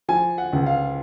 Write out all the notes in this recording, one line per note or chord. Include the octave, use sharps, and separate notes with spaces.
F3 G#5
F#5
C#2
F5